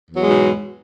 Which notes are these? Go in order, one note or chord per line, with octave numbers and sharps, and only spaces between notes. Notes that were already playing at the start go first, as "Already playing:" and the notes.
E2 G#2 B2 F#3 G#3